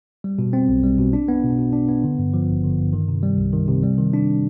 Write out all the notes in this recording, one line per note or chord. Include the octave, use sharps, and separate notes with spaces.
G3
B2
C4
B1
G3
B2
D4
B3
B2
B2
D4
B3
D3
G2
F3
G#1
D3
G2
D#3
C3
G3
C2
D#3
C3
G3
D#3
D4